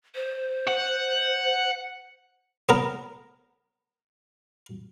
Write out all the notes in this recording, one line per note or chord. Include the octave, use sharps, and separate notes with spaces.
C5
F#5
B3 A#4